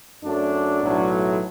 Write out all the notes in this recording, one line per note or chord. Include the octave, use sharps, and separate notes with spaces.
F#2 F#3 A3 D4
B1 A2 F#3 A3